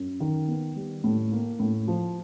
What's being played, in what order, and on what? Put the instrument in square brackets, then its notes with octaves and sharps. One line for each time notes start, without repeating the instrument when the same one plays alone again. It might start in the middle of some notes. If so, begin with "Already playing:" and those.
Already playing: [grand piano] F#2
D#3
B3
G3
A2
A#3
A2
F3